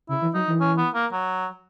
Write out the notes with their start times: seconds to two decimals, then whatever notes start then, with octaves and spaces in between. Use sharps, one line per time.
0.09 C#3 E4
0.22 E3
0.34 F#3 D#4
0.48 E3
0.61 C#4
0.78 B3
0.94 A#3
1.12 F#3